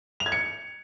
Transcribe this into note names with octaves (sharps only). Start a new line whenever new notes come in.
F7
G#6
C#7